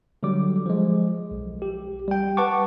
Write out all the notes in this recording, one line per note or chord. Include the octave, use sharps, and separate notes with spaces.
D3 F#3 G3 D6
F3 G#3
B1
G4
G3 G5
B4 F#5 A5 C#6 D6